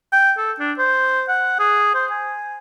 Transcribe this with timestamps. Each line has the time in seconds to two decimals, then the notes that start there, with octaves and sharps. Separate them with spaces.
0.12 G5
0.38 A4
0.59 D4
0.78 C5
1.28 F#5
1.59 G#4
1.95 C5
2.11 G#5